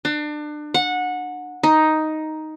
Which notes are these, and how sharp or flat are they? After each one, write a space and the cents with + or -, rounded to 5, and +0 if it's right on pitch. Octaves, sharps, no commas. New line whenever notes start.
D4 +30
F#5 -20
D#4 +5